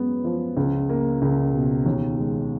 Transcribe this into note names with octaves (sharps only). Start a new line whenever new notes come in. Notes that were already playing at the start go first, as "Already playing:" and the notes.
Already playing: F#2 G#3 B3
F3
C#2
A#3
C#2
B2
D#2
G#3